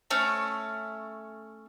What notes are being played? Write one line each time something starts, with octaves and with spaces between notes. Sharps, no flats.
A3 C#4